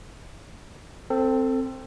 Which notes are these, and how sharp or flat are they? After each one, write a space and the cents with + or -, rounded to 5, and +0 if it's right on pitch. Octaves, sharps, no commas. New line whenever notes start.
C4 +0 A4 +25